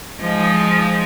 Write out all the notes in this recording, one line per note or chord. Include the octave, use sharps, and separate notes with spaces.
F3 G#3 D#4